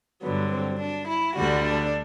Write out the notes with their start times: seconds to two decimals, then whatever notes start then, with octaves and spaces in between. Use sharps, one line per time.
0.22 G2 D3 F#3 B3
0.51 C4
0.79 D4
1.07 E4
1.35 D2 D3 G3 F#4
1.63 D4